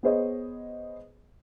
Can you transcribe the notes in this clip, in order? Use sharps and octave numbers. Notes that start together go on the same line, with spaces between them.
B3 G#4 C5 C#5 D#5